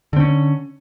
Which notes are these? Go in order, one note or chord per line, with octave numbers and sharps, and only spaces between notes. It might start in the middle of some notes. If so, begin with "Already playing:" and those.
D3 C4 C#4